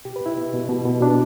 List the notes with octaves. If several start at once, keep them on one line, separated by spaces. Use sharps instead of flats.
B2 G4
B4
B2 E4
B2
B2
B2
B2
B2 D4